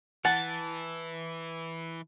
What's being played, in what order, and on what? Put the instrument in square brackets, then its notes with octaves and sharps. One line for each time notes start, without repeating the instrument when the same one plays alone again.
[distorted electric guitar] E3 [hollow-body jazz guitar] F#5 [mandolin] A5